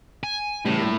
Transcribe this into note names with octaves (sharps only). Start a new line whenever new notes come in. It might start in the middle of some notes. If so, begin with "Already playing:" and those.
G#5
A2 C#3 E3 G3
G2 A#2 A#3